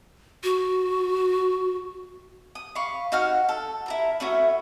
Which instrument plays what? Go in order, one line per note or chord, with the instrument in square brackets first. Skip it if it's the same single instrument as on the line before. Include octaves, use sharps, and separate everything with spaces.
[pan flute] F#4
[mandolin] D#6
F5 B5 C#6
D#4 F#4 F#5 F6
A4
E4 F#4 A#4
A3 C#4 E4 F#4